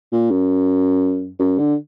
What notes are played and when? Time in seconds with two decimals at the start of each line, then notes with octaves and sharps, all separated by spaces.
0.13 A#2
0.31 F#2
1.40 F#2
1.58 D3